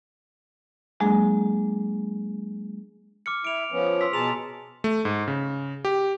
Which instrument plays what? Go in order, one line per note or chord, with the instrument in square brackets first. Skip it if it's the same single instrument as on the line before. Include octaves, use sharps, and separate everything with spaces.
[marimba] F#3 G#3 A#3 D4 G#4
[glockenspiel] D6 F6 C#7
[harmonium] E4 [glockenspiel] D7 F7
[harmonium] F3 B3 C#4
[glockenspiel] C6 E6 B6
[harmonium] B2 G#4 A5 [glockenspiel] A#5 C6 F7
[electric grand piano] A3
G#2
C#3
G4